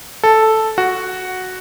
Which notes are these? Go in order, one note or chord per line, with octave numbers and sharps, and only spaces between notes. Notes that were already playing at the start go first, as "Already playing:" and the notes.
A4
F#4